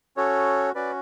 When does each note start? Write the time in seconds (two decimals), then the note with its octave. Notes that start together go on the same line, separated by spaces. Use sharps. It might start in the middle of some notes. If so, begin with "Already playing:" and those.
0.17 C#4 F#4 A4 C#5
0.75 C#4 F#4 B4 D5